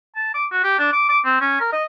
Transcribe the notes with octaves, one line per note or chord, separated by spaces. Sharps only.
A5
D6
F#4
G4
D4
D6
D6
C4
C#4
A#4
D#5